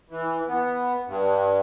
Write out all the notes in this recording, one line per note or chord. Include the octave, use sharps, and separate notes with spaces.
E3
B3
G2